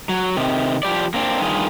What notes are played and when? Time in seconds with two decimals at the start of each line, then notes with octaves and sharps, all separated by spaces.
0.09 F#3
0.37 C3 D#3
0.83 F3 G4 D5
1.14 A#3 C4 D4
1.40 G2 D#3 F4 G#4